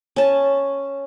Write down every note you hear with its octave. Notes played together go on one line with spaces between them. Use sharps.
C#4 A5